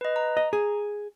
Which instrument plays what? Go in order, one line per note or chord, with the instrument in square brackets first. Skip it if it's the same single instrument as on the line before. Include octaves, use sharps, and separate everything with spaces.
[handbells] B4 D#5
A#5
[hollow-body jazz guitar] D#5
G#4